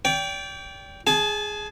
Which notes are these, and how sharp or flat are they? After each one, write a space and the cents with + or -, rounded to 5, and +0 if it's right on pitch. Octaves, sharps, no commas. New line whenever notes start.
D5 -40 G5 +0
G#4 +0 A5 -30